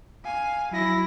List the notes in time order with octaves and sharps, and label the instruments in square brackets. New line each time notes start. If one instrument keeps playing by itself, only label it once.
[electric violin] F5 G#5
[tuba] F#3 [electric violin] E4 A#6